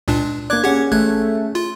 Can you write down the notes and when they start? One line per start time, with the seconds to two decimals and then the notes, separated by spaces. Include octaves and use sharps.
0.08 C#2 A#2 D4
0.50 A#3 D4 D5 D6 F#6 G#6
0.64 C#4 G4 G#4 F#5
0.92 A1 A3 F#6 G#6
1.55 F4